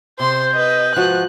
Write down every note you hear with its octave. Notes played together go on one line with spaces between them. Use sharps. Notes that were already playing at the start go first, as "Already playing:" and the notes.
C3 C5 C6 G6
B4 D#5
G#2 F3 F#4 F#6